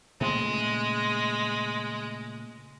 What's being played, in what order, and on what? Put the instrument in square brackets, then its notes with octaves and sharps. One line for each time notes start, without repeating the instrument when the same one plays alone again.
[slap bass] A#2 C#3 A3 [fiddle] G#3